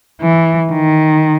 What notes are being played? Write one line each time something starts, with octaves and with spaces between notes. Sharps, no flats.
E3
D#3